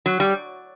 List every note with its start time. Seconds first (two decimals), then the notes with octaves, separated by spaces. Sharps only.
0.06 F#3
0.20 G3